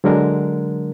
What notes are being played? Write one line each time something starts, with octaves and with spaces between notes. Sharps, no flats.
D3 F#3 G#3 D4 A#4